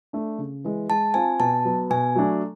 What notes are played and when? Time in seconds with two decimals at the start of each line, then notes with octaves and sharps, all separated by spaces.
0.13 A3 D4
0.38 C#3
0.64 E3 G#3
0.89 G#3 A5
1.14 C4 F4 G#5
1.39 B2 A5
1.65 F#3 B3
1.90 B2 G#5
2.16 F#3 A3 D4